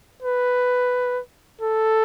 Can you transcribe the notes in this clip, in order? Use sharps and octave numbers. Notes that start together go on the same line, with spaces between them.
B4
A4